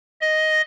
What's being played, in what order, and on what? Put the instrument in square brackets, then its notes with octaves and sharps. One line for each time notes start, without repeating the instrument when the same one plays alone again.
[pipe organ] D#5